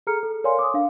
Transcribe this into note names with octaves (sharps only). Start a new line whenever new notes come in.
G#4 A4 A#5 F6 C#7
A4
A#4 C#5 D5 F5 G#5 C6
D6 D#6
D4 F5